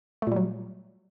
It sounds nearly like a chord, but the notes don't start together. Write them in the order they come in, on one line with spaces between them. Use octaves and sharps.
A3 A#2 G3 F#3